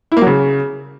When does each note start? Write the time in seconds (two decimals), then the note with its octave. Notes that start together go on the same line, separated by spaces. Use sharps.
0.12 E4
0.17 A#3
0.22 F#3
0.27 C#3